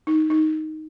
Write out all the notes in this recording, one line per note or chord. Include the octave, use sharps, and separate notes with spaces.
D#4
D#4